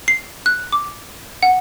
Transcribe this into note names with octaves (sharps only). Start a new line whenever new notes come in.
C7
F#6
D6
F#5